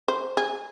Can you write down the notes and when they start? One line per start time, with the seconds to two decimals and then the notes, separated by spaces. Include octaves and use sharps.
0.08 C5
0.37 G#4